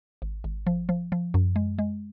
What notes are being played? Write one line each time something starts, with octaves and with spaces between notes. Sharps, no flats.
G#1
G#1
F3
F3
F3
F#2
G#3
G#3